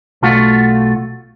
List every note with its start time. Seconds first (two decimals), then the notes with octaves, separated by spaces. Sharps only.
0.22 B1 A3 F4 F#4